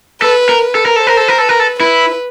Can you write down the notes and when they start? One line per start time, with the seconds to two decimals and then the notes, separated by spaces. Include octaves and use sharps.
0.22 A4 B4
0.49 A#4
0.63 B4
0.75 A4
0.86 A#4
0.96 A4
1.02 C5
1.07 A#4
1.17 A4
1.28 A#4
1.38 A4 B4
1.49 A#4
1.60 A4
1.80 E4 B4